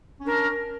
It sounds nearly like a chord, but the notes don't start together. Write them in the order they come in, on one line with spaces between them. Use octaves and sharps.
C#4 D4 A#4